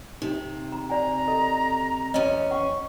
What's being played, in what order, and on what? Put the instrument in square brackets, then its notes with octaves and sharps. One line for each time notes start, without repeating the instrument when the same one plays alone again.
[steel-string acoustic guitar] C3 [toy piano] D#4
[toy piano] A#5
[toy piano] D5 F#5 G#5 [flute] A#5
[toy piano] A4 D#5
[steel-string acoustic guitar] E2 C#4 [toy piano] D#5 A#5
[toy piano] F#5 [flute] C#6